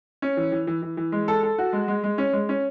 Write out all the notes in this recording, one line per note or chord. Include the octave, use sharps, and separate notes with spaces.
C#4
E3
E3
E3
E3
E3
G#3
A4
A4
F#4
G#3
G#3
G#3
C#4
G#3
C#4